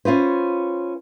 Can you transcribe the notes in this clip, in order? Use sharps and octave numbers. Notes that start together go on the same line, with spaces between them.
C#4 F4 B4 C5